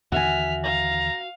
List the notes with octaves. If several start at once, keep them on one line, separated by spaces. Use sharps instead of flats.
D#2 D3 E3 F#4 E5 G#5 F6 B6
F5 A#5